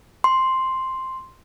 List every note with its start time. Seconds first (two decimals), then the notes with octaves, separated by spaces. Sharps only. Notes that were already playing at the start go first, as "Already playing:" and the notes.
0.24 C6